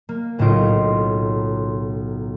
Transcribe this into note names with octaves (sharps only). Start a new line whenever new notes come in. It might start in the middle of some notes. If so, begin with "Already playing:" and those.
A#3
B1 A2 C#3 D#4 F4 D7